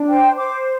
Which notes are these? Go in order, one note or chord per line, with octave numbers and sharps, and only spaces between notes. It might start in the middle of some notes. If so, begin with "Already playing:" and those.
Already playing: D4
C5 G5
C5 D6